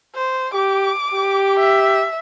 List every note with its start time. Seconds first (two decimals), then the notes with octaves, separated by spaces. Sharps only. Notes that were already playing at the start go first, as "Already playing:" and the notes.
0.15 C5
0.54 G4 D6
1.13 G4
1.59 E5